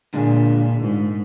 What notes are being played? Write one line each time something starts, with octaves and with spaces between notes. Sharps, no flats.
A#2 D3 G#3 D4 F4 G#4
G#2